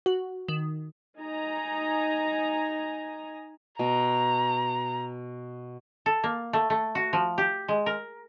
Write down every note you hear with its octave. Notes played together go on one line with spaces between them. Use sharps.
F#4
D#3
D#4 G#5 A#5
B2 A#5
A4
A#3
A3
A3
F#4
F3
G4
G#3
A#4